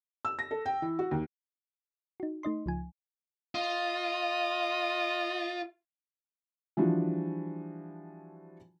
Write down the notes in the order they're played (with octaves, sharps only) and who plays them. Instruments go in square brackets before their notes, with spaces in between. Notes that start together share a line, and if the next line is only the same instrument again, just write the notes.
[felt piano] E6
A#6
A4
G5
E3
F#4
D#2
[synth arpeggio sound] D#4 F#4
A3 D#4 D#5 C6
C#2 F3 G#5
[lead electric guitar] F4 [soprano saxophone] D#5
[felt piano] E3 F3 G3 D4 F#4